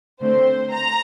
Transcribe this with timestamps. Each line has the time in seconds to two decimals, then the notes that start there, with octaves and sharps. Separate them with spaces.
0.21 D3 A3 C4 C5
0.73 A#5